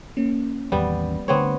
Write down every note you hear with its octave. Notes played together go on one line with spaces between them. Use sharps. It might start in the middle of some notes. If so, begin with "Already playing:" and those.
A#3 C#4
A1 E2 D#3 G3 B3
D3 A3 B3 C4 C#5